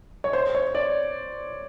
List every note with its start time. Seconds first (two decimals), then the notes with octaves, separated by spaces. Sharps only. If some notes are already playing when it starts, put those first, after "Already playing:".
0.24 C#5
0.33 C5
0.55 C#5
0.75 D5